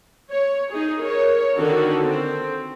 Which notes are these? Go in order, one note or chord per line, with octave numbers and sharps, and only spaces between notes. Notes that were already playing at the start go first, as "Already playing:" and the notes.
C#5
D#4 G#4
A#4 C#5
D3 D#3 F#4 A4
C4